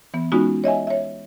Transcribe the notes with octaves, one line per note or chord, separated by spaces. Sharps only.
E3 B3
G#3 B3 C#4 D#4 F4 F#4
C#5 D#5 E5 G#5
C#5 E5